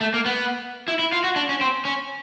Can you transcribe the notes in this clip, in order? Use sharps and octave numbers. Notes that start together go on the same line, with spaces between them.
A3
A#3
B3
E4
E4
F4
F#4
D4
C#4
C4
C#4